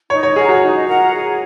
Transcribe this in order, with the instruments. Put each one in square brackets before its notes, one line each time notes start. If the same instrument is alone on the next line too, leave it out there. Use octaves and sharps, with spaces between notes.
[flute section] D#4 [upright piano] C#5
[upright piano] C#5
[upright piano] G#4 [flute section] A#4 F#5 A#5
[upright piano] F#4
[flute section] D#4
A#4 F#5 A#5
G#4